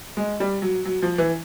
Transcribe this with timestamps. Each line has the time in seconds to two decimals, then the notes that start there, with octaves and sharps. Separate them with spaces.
0.17 G#3
0.40 G3
0.62 F#3
0.85 F#3
1.02 F3
1.18 E3